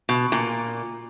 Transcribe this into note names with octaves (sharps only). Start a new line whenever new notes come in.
B2
A#2